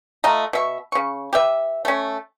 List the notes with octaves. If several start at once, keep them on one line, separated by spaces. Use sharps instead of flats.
A3 F4 D#5 A#5
B2 E5 C#6
C#3 C#6
G4 B4 E5
A3 C#4